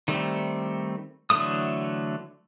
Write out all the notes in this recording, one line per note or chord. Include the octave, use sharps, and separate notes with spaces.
D#3 G3 A3 C4
D3 E3 F#3 A3 D#6